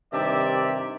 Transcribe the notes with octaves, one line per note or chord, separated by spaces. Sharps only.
G2 C3 D#3 G4 D5 E5